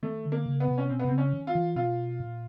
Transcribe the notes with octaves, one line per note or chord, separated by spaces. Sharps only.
D#3 A3
D3
A#3
C#3
B3
C3
C#4
B2 C4
B3
C3
C#3 C4
C#4
D#3
F4
E3
B2 F4
A#2